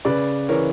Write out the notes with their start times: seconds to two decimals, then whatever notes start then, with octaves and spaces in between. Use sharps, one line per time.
0.05 C#3 B4 D5
0.49 E3 A#4 C#5